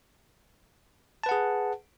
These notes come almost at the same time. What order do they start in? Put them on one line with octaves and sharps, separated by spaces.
A5 B4 F#5 G#4